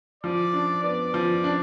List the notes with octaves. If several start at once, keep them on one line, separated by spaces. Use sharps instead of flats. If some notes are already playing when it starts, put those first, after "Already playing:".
F3 D5
D4
B3 D5
F3
D4